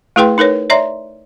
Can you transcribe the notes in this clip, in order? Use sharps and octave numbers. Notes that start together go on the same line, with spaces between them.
A3 E4 G#4 B4 G5 C6
D#4 A#4 B4 C#5
C#5 D5 E5 A#5 C6